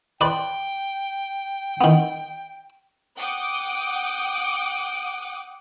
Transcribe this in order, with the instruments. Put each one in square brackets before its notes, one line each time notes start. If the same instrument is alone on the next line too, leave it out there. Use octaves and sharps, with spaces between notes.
[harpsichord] B4 C5 D5 [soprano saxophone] G5
[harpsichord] D#3 B3
[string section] F#5 G5 D6 D#6